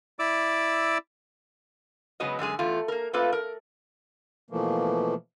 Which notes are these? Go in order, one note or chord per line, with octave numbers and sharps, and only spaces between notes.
E4 D5 D6 E6
C#3 F#3 G#3 B3 F#4 D#5
F#2 D3 G#3 G#4
E2 A3 F4
A#3 A#4
A3 A#3 C4 F4 A4 B4
A#4
B2 E3 F3 A3 A#3